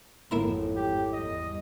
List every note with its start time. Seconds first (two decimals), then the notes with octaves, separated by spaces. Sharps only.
0.31 G#1 F2 A2 A#3 E4 A#5
0.76 G4
1.13 E2 G3 D#5